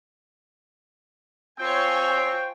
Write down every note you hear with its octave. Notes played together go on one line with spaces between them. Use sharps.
C4 F4 C5 C#5 G5 G#5 C#6